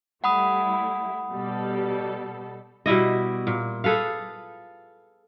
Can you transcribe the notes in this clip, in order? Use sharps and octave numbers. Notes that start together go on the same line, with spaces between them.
G3 A3 E4 F#5 B5 D#6
B2 G3 A4
B2 G3 E4 D#5
A#2
G#4 A4 B4 F5